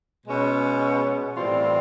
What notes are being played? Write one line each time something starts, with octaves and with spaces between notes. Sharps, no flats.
B2 G#3 C#4
A2 E3 G3 C4 F4